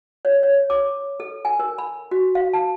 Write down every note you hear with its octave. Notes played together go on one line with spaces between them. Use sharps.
C#5
C#5
D6
A4
G#5
A#4
B5
F#4
F5
A5